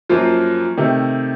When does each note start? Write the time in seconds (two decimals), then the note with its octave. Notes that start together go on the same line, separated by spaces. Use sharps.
0.09 F#2 F3 A#3 F4
0.77 C3 D#3 A3